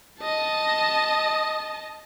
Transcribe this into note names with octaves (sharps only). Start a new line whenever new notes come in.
D#5 A5